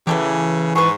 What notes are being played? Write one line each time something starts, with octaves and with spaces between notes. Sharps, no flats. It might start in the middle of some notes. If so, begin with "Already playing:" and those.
C#3 E3 F#3 A3 G4
G#2 G#4 B4 C#6